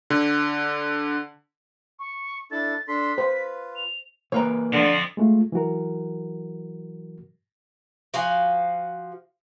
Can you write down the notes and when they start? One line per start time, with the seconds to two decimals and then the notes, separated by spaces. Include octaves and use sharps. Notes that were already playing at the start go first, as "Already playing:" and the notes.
0.10 D3
1.99 C#6
2.51 D4 E4 A4 A6
2.88 D4 A4 C6 B6
3.18 F4 B4 C5
3.76 F7
4.32 E3 A#3 B4 C#5 A#5
4.73 F2 D3 F3
5.17 G#3 A3 F4
5.52 E3 F#3 F#4 A#4
8.14 F3 F#4 F5 G#5